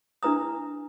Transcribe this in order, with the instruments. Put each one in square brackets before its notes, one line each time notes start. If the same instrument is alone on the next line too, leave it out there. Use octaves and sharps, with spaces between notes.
[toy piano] D4 E4 B4 A#5 D#6